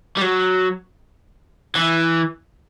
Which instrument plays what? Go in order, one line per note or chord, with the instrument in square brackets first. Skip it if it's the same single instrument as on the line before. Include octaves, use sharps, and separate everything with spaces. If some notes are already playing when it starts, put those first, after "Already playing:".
[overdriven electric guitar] G3
F#3
E3